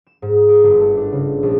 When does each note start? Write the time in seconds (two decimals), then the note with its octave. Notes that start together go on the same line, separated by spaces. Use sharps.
0.07 E7
0.22 G#2
0.48 A#4
0.63 G1
0.80 A3
0.97 D4
1.12 C#3
1.43 A#1